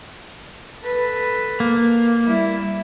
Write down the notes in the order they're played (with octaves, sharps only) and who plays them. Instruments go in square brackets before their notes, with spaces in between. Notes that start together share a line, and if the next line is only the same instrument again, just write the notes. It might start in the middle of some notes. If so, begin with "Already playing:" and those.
[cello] A4 B4
[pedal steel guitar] A#3
[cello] G3 E4